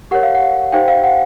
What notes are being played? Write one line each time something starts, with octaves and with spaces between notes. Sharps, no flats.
G4 A#4 C#5 F#5
F5
F#5
D#4 G4 C5 F5 G5
F5
F#5